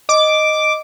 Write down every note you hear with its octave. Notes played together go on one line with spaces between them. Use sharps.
D#5 D6